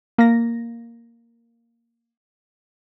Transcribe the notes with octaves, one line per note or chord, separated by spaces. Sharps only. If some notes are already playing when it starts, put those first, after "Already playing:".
A#3 A#6